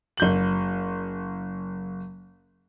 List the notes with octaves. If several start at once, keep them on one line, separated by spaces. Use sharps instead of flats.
F#1 G6 F#7